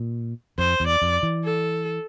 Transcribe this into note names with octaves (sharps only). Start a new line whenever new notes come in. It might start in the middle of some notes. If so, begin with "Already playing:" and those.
Already playing: A#2
F2 C5
E2
D5
F2
E3
A4